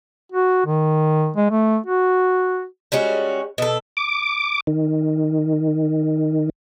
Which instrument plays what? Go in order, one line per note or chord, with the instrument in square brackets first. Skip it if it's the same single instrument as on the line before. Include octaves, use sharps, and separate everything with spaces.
[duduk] F#4
D#3
G#3
A3
F#4
[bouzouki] G3 G#3 C#4 F#4
B2 A4
[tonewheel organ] D6
D#3